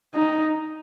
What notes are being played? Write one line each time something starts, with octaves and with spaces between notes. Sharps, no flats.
D#4